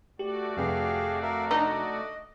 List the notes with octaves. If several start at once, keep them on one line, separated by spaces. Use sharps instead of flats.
A3 F#4 G4 D5
F2 C3 G4 G#4 F5
A#4 E5 F5
D4 D#4 D#5